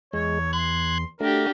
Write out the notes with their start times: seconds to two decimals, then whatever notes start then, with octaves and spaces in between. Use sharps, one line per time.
0.13 E2 G#3 C#5
0.53 C6 F#6 G#6
1.21 A3 D4 F#4 G4 A#4